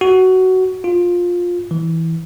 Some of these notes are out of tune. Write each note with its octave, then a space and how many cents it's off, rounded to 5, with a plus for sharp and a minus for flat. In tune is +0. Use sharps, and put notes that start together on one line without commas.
F#4 +15
F4 +15
E3 -15